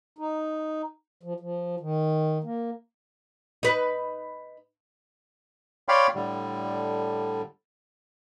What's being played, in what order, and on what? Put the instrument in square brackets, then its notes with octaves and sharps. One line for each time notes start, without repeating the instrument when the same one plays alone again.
[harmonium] D#4
F3
F3
D#3
A#3
[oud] D#4 B4
[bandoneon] C#5 D5 F5 G5 B5 C6
A2 D3 G3